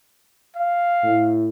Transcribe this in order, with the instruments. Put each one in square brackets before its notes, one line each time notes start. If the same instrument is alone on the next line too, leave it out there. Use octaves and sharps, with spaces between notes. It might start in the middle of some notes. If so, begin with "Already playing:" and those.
[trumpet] F5
[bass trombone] A2